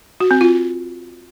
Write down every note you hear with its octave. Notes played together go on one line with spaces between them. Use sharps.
F#4
C4
F4